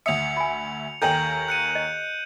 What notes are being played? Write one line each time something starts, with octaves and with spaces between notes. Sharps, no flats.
D2 E5 D#6 C#7 F7
G#5 B5
D#2 A4 A#4 G5 G#5 G6 F#7
F#6 C#7 D#7
D#5